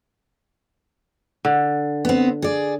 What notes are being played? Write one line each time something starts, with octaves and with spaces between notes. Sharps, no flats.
D3
B3 C4
G#4 D5